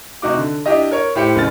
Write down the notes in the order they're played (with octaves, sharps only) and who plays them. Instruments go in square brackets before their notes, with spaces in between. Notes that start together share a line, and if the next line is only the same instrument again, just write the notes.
[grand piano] C3 D#4 F#4 D6
D3
D4 E4 G4 D#5
A#4 C#5
A2 E4 G4 C5 C#7
F#1 F#2 F6 A6